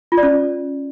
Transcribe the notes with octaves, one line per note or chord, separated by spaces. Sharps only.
F4
D5
C#4